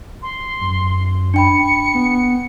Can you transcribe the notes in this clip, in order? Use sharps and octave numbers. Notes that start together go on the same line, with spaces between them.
C6
F#2
D4 G5 B5 C#7
B3